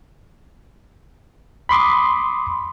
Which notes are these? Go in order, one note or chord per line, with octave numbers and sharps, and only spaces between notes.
B5 C6 D6 D#6